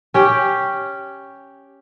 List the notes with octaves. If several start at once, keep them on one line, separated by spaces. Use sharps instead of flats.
C#4 G4